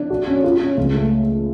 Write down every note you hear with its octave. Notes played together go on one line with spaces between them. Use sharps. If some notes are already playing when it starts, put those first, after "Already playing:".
Already playing: D4
F#4
C#4
F4
C#4
C#2
A3